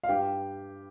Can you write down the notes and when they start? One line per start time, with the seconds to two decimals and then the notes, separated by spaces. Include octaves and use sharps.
0.04 F5
0.09 G2 G4 G5